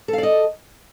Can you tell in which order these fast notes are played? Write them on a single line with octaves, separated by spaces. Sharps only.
A4 F5 D5 D#5